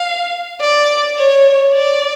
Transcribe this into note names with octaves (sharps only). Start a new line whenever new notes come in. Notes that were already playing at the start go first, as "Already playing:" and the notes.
Already playing: F5
D5
C#5
D5